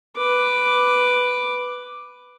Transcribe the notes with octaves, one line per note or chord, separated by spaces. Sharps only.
B4 D6